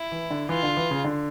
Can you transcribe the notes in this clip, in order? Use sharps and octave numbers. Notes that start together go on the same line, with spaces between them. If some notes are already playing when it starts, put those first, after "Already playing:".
Already playing: E4
E3
D3
E3 F4
D3
E3
C#3
D3